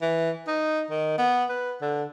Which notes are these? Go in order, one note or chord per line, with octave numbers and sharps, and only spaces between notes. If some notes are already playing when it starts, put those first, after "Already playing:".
E3
D#4
D#3
B3
B4
D3